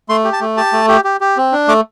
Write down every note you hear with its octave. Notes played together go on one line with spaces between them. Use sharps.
A3 C6
G4
A5
A3
G4 A5
A3
G4
G4
G4
C4
D4
A3 D6